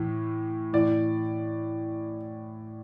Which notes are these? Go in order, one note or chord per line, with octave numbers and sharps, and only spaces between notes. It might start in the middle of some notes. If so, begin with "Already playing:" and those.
Already playing: A2 E3
A2 E3 D5